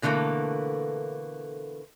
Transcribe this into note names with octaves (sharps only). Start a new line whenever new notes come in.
B2 D3 E3 A3 A#3